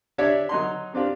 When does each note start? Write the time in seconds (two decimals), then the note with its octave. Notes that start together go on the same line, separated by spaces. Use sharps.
0.18 D4 G4 C#5 D5 E5
0.49 F#3 D#4 C6
0.94 C4 D4 F4 G4